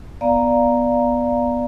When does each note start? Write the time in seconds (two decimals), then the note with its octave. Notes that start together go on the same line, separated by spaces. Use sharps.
0.21 B3 D5 F5 A#5